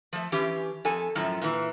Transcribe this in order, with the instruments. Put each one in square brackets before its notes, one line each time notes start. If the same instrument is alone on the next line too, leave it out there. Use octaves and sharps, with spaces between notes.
[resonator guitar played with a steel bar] F3 A3
E3 C#4 G4
F2 A4 G#5
F#2 A2 F3
A#2 E3